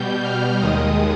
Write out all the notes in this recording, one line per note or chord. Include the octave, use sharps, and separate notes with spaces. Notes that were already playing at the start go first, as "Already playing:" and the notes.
Already playing: B2 G3 G6
F6
D#2 D#3 G#3 D#6